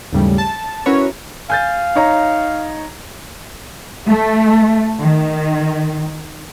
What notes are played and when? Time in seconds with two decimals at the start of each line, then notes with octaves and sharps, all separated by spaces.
0.13 D#2 G#2 C#3 E3 G3 A3
0.38 A5
0.86 C#4 E4 F#4 A#4 B4 C#5
1.50 F5 G#5 G6 A6
1.95 D#4 C#5 A#5
4.09 A3
5.00 D#3